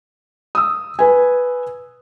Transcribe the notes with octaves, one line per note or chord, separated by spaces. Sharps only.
D#6 E6
B4 G#5